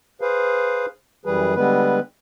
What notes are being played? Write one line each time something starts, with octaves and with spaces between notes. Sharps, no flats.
G#4 B4 C5 F5
F#2 E3 G3 G#4 B4
D3 G3 G#3 B3 B4